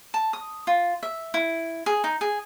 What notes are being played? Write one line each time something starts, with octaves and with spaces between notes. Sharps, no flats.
A5
D#6
F4
E5
E4
G#4
D#4
G#4